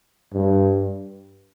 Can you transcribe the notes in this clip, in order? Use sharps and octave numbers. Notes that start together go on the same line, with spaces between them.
G2